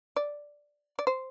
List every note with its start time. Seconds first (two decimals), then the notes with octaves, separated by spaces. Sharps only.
0.16 D5
0.99 D5
1.07 C5